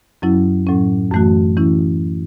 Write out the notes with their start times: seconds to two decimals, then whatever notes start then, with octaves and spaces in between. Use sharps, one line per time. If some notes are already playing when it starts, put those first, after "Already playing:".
0.22 F#2 F#3 C#4 E4
0.67 A2 F#3 C#4
1.12 F#2 E3 A3 F#4
1.57 E3 C#4 E4